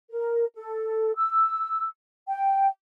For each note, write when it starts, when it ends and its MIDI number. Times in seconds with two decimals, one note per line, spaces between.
0.10 0.45 70
0.54 1.12 69
1.16 1.86 88
2.28 2.67 79